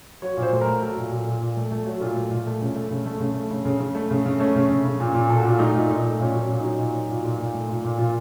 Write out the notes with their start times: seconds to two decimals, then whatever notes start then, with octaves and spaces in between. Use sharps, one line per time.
0.22 F#3 C#5
0.37 A#2
0.42 C5
0.52 A3
0.61 A#4
0.66 A3
0.81 F#3 A4
0.97 A#2
1.12 A#2
1.27 A#2
1.41 A#2
1.57 A3
1.71 A3
1.86 F#3
2.01 A#2 F4
2.16 A3
2.31 A#2
2.47 A3
2.61 C#3
2.75 A3
2.91 C#3
3.06 A3
3.20 C#3
3.36 A3
3.51 C#3
3.65 C#3
3.80 C#3
3.95 A3
4.11 C#3
4.26 C#3
4.40 A3 C#4
4.55 C#3
4.69 C#3
4.85 C#3
5.00 A#2
5.15 A#2
5.29 A#2 A4
5.39 F#4
5.45 A#2 F4
5.59 A3 D#4
5.75 A#2
5.89 A#2 D#4
6.04 A3
6.19 A#2 C#4
6.34 F#3
6.39 C#4
6.50 A#2
6.60 F#3 D#4
6.79 A#2
6.94 F#3
7.10 A#2
7.24 A#2
7.39 A#2
7.54 A3
7.69 A#2
7.84 A#2
7.98 A#2 F4